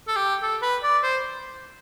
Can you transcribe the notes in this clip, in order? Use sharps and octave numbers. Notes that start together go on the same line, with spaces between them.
A4
G4
A4
B4
D5
C5